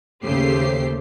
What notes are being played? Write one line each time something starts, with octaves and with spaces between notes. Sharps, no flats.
D#2 C#3 A3 G4 C5 C7